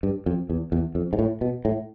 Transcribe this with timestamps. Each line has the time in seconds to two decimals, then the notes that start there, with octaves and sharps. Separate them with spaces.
0.03 G2
0.26 F2
0.50 E2
0.72 E2
0.95 F2
1.13 G#2
1.19 A2
1.41 B2
1.65 A2